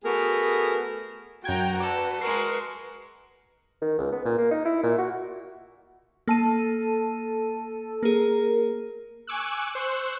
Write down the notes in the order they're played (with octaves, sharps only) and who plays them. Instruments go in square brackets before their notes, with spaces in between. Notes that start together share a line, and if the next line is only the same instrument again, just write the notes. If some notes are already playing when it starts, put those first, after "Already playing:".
[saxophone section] A3 B3 F#4 G#4 A#4
[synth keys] F#2 G#6 [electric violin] F#4 [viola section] G5 A#5
[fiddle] A4 [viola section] B4 [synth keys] D5
[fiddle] G#3 F#4 [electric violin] A#4 [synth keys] C7
[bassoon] D#3
C#2
B3
A#2
A#3
D#4
E4
A#2
F#4
[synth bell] A#3 A5 D#7 [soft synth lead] A4
[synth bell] A#3 G#4 [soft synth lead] A#4
[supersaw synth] G#5 C#6 D6 E6 F#6
C5 C#6 E6 F#6